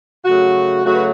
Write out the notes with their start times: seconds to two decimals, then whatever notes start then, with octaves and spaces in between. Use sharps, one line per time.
0.25 C#3 F#3 A3 F#4
0.83 C#3 F#3 A3 F#4
0.95 B4